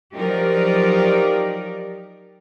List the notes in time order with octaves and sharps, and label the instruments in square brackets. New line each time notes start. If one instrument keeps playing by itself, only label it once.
[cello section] F3 F#3 D#4 G4 A#4 D5